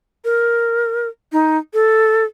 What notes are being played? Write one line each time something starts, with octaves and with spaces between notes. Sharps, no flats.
A#4
D#4
A4